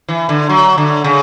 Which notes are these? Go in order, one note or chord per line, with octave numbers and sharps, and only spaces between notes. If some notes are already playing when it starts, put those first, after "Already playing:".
E3
D3
F#3
D3
C#3